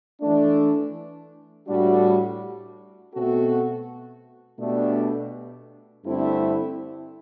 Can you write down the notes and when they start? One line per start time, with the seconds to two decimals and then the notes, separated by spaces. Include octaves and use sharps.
0.21 E3 A3 D4
1.66 A2 G3 D4 F#4
3.11 B2 A3 C4 F#4 A4
4.58 B2 A3 D4 G4
6.03 G2 D3 A3 C4 E4